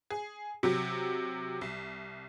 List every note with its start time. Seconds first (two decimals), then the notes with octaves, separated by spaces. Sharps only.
0.10 G#4
0.63 C3 F#3 G4
1.61 C2